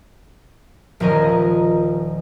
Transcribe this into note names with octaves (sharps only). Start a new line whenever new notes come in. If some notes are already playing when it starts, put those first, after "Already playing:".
D#1 F3 C#4 A#4 D#5